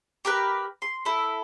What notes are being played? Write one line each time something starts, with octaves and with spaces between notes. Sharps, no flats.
G4 A#4 B4
C6
E4 A4